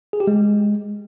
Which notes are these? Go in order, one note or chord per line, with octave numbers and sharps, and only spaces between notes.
G#4
G4
G#3